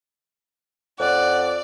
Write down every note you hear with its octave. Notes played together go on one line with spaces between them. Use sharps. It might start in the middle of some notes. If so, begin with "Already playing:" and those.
F2 D5 F#5